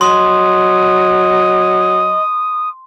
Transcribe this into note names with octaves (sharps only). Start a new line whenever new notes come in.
F#3 D#5 C6 D#6